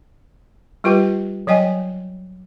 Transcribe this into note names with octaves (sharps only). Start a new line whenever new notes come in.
G3 F4 G4 B4 G5
F#3 C#5 D#5 G5 G#5